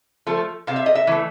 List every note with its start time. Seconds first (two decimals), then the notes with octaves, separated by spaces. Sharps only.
0.27 F3 A3
0.67 C3 F5
0.76 E5
0.86 D#5
0.95 E5
1.07 E3 A3